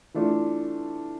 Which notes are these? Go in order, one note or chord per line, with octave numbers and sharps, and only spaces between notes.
E3 A3 D4 F4